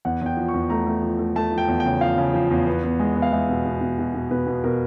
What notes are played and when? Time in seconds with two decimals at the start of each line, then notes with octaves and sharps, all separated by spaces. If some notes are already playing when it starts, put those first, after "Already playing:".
0.05 E2 F#5
0.21 E2 G5
0.37 F3
0.48 C#6
0.54 E2
0.70 A3 A#5
0.87 A3
1.03 F3
1.19 A3
1.36 A3 A5
1.52 F3
1.58 G5
1.68 E2
1.80 G5
1.85 C#3
2.01 F3 F5
2.18 C#3
2.34 F3
2.51 E2
2.67 B3
2.83 B3
2.99 G#3
3.15 B3
3.22 F5
3.32 G#3 E5
3.49 B2
3.65 B2
3.81 B2
3.99 B2
4.14 B2
4.31 B2 B4
4.47 B2
4.64 B2 A#4